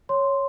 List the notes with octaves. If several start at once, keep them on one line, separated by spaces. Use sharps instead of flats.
C#5 C6